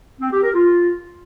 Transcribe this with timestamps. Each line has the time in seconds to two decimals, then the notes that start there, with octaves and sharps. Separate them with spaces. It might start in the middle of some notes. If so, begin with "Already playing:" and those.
0.20 C4
0.31 G4
0.43 A#4
0.54 F4